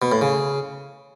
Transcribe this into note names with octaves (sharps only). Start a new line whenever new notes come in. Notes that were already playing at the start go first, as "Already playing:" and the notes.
B2
A2
C#3